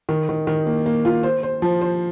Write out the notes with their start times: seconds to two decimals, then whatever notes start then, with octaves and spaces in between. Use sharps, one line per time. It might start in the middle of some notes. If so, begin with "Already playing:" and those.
0.09 D#3
0.29 D#3
0.47 D#3
0.67 A#3
0.86 A#3
1.05 F4
1.23 C5
1.43 C5
1.62 F3
1.81 C5